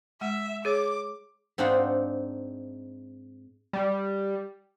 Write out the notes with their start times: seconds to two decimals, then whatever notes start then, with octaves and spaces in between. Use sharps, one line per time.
0.21 G#3 E5 F#5
0.65 G#4 C#5 D6
1.58 G#2 C4 D4 D#4 F4 F#5
3.73 G3